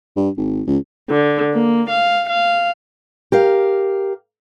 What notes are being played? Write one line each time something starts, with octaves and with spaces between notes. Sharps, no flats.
G2
G#1
C#2
D3
A#3
F5
F5
G4 A#4 F5